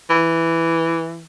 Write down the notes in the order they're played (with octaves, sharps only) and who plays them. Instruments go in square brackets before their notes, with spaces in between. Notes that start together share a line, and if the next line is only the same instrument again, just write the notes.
[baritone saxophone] E3